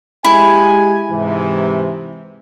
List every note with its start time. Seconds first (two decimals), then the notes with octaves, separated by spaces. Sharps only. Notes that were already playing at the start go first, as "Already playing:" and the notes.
0.24 G#3 E4 G4 G#5
1.09 G#2 C3 E3